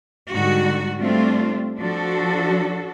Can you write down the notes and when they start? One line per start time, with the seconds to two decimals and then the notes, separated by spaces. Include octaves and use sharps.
0.32 G#2 D3 G3 F#4
0.99 G3 A3 C4 D4 F4
1.78 F3 D4 F#4 A4